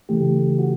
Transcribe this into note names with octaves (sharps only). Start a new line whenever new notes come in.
C#3 E3 A3 G4
F#4